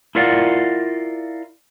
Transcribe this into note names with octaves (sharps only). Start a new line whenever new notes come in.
E4 F4 A#4 D5 F5 F#5